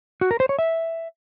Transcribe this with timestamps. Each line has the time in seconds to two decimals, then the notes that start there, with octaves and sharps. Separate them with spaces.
0.21 F#4
0.31 A#4
0.40 C5
0.49 C#5
0.59 E5